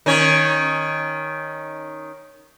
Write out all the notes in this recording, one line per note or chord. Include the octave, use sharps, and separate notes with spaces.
D#3 C#4 C#5